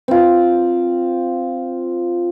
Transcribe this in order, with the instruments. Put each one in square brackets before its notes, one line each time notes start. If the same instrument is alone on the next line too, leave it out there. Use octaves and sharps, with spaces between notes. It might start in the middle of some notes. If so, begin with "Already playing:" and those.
[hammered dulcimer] C4 F4